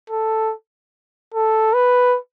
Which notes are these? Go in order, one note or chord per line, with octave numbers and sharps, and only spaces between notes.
A4
A4
B4